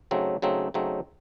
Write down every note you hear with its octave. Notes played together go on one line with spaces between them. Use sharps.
C#3 F#3 A3 C4 D#4
C#3 F#3 A3 C4 D#4
C#3 F#3 A3 C4 D#4